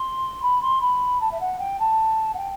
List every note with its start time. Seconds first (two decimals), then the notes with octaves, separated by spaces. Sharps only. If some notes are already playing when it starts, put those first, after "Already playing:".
Already playing: C6
0.42 B5
0.62 C6
0.81 B5
1.21 A5
1.31 E5
1.40 F#5
1.59 G5
1.80 A5
2.34 F#5
2.38 G5